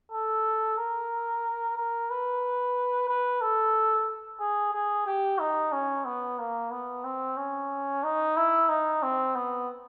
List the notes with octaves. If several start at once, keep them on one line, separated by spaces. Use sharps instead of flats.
A4
A#4
A#4
B4
B4
A4
G#4
G#4
G4
D#4
C#4
B3
A#3
B3
C4
C#4
D#4
E4
D#4
C4
B3